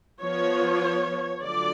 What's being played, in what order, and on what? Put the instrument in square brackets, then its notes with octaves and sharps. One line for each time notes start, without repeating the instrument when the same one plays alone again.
[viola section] F3 B3 F4 C#5
D3 F#3 A3 F4 D5